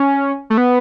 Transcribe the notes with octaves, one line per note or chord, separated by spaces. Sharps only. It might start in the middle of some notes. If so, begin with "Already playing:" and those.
Already playing: C#4
A3
B3